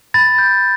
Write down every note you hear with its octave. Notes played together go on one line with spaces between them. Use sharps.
B5 A6
G6